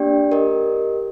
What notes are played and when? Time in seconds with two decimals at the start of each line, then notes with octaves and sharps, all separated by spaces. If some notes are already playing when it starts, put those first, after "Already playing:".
Already playing: A#3 D4 G4 D5 G5
0.32 G4 A#4 D#5